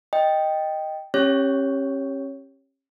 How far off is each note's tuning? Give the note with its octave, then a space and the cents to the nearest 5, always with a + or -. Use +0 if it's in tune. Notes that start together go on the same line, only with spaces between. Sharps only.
D#5 +0 G5 +0
C#4 -35 G4 +10 C#5 +0